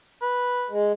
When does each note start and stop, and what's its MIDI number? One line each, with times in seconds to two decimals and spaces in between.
0.22 0.71 71
0.70 0.92 56